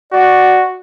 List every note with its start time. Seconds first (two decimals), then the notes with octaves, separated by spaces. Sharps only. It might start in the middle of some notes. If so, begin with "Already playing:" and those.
0.12 F#4 D5